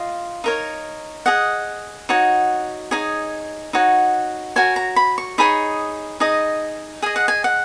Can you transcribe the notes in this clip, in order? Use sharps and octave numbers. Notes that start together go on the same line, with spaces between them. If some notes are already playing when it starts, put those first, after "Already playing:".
Already playing: F4 D#5 F5
D#4 A#4 C#5
G#4 D#5 F#5
D#4 F#4 C#5
D#4 G#4 C#5
D#4 F#4 C#5
F#4 A#4 C#5 G#5
A#5
B5
C#6
D#4 G#4 C#5 B5
D#4 G#4 D#5
G#4 D#5 G#5
F#5
G#5
F#5